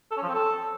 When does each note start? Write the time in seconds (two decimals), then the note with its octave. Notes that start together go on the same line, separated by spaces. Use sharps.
0.11 A4
0.17 C#4
0.23 F3
0.29 C4
0.35 A4